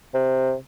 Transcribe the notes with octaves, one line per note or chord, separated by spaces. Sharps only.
C3